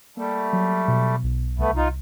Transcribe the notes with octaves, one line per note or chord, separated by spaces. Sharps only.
G3 A3 A#3
F#3
B2
B1
C2 A3 B3
D#4 F4